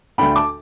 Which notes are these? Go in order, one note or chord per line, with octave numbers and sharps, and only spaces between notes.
D2 D3 A3 D4 G5 B5
A5 D6